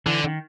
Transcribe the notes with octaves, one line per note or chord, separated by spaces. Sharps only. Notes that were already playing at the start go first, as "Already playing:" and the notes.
D3 E3
D#3